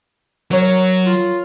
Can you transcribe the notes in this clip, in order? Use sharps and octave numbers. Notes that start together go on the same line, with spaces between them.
F#3 A#4 C#5
F4